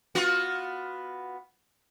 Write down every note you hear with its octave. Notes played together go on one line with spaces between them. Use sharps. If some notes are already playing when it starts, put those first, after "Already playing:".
B3 F4 F#4